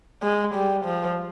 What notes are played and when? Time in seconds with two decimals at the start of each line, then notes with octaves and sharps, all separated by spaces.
0.22 G#3
0.54 G3
0.85 F3